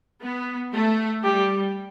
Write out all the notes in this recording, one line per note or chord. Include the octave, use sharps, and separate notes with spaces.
B3
A3
G3 G4